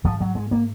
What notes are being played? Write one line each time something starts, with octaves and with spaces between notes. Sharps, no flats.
G#2 F3
F#3
G#3
A#3